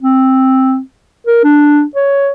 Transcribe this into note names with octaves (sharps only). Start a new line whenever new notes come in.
C4
A#4
D4
C#5